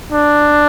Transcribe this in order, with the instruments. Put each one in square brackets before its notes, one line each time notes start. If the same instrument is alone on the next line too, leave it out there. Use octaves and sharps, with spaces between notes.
[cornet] D4